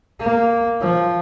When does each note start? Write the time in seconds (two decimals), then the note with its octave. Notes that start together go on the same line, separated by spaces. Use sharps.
0.20 A#3
0.81 F3